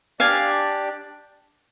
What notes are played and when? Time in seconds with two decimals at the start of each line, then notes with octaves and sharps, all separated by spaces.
0.20 D4 G4 D5 F5 G#5